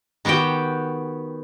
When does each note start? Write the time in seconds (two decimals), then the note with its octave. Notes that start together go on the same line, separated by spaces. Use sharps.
0.25 D#3 B3 F#4 G4 G5